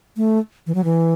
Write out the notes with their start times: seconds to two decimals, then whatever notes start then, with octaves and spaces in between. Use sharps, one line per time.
0.17 A3
0.67 E3
0.75 F#3
0.84 E3